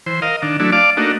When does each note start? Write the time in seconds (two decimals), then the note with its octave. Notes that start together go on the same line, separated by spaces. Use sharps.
0.06 E3 C5
0.22 A#4 D#5 F5
0.42 D#3 D4
0.60 F#3 A3 D4 E4
0.72 D5 F5 A5 D6
0.97 A3 A#3 D4 D#4 F#4